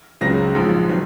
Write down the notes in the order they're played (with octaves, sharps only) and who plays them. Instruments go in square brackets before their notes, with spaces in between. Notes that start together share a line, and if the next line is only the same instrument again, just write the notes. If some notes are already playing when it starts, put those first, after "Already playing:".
[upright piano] C#2 C#3 F#3 C4 A#6
A#1 G#2 F3
D#3 F#3 C4